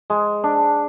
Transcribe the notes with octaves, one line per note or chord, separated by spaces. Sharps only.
G#3
D4